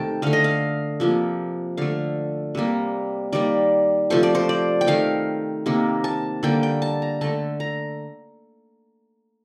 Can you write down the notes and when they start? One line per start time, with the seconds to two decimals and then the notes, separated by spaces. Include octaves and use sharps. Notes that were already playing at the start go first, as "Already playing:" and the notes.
Already playing: C3 D#3 A3 G5 A5
0.22 D3 A3 F5
0.33 D#5
0.44 F5
1.00 C3 F3 A#3
1.77 D3 A3 F5
2.55 C3 G3 A#3
3.33 D#3 G3 A#3 D5
4.10 C3 F3 A3 C5
4.23 D5
4.35 C5
4.49 D5
4.81 G5
4.87 D#3 A3 F5
5.66 C3 D#3 A#3
6.04 A5
6.43 D3 G3 A#3 G5
6.63 G5
6.82 A5
7.02 A#5
7.21 D3 A3 A5
7.60 A#5